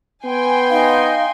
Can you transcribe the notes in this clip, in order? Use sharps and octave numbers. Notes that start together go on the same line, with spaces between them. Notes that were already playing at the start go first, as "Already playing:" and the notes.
B3 G5 G#5 C6
D#4 F5